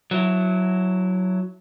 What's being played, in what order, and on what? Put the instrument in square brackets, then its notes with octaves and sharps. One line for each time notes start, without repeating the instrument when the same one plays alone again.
[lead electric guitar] F#3 E4